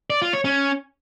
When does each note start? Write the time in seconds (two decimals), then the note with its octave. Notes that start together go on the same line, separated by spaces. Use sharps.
0.10 D5
0.22 F4
0.33 C#5
0.45 C#4